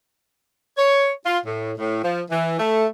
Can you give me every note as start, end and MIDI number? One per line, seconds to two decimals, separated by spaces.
0.77 1.10 73
1.25 1.38 65
1.45 1.72 45
1.77 2.03 45
2.03 2.22 53
2.30 2.58 52
2.59 2.85 57